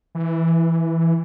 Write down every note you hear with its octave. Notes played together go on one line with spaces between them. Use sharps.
E3